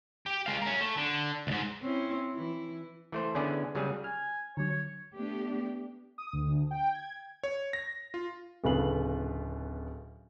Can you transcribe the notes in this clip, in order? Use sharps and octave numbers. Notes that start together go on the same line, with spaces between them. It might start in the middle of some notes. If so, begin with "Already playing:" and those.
G4
G#3 F5
C#4 A#4
A3
D3
C#2 G#2
C4 C#4 E4
E3 E4
E3 A3 C5
D3 B3 C#4 E4 G#4 D5
C#3 F#3 G3 G#4
G#5 F6
D3 F#3 C#5
C#5
A3 B3 D4 G4
D#6
D2
G5
G#6
C#5
A#6
F4
D1 C#3 A4 B4 F5 F#7